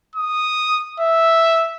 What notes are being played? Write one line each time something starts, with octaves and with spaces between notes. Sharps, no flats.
D#6
E5